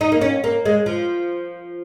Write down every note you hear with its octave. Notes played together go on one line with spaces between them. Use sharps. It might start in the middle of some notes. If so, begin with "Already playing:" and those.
D#4
A#3
C#4
A#3
G#3
F3